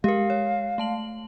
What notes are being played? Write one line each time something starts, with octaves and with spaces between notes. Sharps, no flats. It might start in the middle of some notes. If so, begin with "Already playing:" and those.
G#3 G4 A#4 F5
C#5
A3 A5 F#7